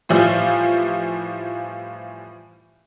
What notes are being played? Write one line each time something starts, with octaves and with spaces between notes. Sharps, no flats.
A2 E3 F3 G3 F4